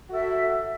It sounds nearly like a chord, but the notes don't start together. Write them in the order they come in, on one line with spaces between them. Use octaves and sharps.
F#4 A4 E5